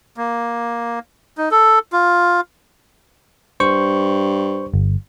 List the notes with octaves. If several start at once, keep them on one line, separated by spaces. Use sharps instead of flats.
A#3
D#4
A4
F4
G2 C5 C#6
G1